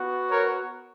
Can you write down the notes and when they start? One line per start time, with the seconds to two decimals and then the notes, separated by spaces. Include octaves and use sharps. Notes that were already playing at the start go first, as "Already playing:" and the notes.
Already playing: B3 F#4
0.30 A#4 C#5